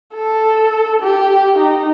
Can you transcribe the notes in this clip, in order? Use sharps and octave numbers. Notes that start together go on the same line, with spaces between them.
A4
G4
D#4